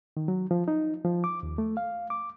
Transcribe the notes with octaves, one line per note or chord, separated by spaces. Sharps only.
D#3
F#3
F3
D#4
F3
D6
D#2
A3
F5
D6